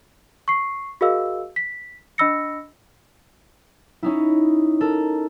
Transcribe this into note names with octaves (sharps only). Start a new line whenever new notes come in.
C#6 C7
F#4 G#4 A#4 D#5 F5 E6
B6
D4 D#5 B5 E6 A#6 C#7
C#4 D#4 E4
A4 A#4